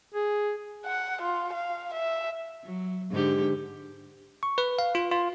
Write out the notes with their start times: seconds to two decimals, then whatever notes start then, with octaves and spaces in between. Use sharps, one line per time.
0.14 G#4
0.86 F#5
1.22 F4
1.53 F5
1.94 E5
2.64 F#3
3.10 G#2 D3 G4
4.43 C#6
4.58 B4
4.79 F5
4.95 F4
5.11 F4